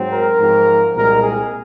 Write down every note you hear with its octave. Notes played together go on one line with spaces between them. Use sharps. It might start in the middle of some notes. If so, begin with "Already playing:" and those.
Already playing: G#2 F#3 C4
A#4
G#2 F3 C4
C2 A#2 G#3 C4 A#4
G#4